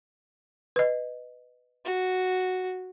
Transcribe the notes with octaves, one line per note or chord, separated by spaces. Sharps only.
B4 D#5
F#4